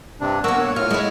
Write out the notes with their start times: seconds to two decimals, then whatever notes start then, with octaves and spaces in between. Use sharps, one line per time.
0.21 G2 C3 D4
0.44 A#3 B3 F#5 C#6 E6
0.61 C#5
0.76 A2 F4 C#5 F6
0.91 G#3 E4